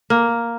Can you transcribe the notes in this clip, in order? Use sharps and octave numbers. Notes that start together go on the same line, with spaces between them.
A#3